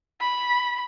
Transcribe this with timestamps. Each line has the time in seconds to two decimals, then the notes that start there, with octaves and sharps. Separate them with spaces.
0.21 B5